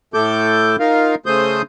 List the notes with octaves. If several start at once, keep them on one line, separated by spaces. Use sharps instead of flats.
A2 A3 A4 D6 G6
D#4 F4 A#4 F5
C#3 A3 C5 D#6 G6